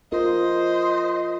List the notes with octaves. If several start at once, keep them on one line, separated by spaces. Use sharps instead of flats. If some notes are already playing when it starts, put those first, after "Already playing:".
F4 A#4 C5 D#5